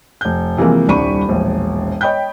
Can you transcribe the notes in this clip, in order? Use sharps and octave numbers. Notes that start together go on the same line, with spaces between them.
F1 G6
C3 E3 F3 G#3 A#3
D#1 C2 D4 B5 C#6 D#7
E1 A#1
C#5 D#5 G5 B5 G6